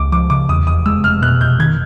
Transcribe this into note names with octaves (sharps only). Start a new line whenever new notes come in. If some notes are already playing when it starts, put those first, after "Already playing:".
Already playing: C#2 D6
F3 D6
C#3 D6
E2 D#6
F1 D#6
G#3 E6
F1 F6
B2 F#6
F1 G6
D#3 G#6